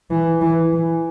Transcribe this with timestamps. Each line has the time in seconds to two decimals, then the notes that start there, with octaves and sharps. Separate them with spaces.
0.10 E3
0.41 E3
0.73 E3